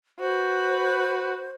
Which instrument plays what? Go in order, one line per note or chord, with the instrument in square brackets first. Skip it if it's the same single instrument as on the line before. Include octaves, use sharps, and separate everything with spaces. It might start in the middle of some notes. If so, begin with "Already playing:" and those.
[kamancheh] F#4 B4 [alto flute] C5